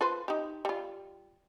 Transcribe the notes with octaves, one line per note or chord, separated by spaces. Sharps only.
F4 B4 C5
D#4 G4
G3 F4